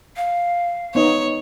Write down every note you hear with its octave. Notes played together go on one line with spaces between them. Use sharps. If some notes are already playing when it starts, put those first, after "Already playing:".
F5
B3 D#4 C#5 D#5